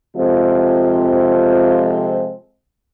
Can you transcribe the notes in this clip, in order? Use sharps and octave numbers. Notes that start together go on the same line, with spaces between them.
C3 F3 G#3 C4 F4 A4